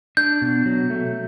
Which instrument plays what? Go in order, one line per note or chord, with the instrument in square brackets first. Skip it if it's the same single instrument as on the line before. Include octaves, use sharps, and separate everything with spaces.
[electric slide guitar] D4 [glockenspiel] G6
[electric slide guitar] B2
F#3
A3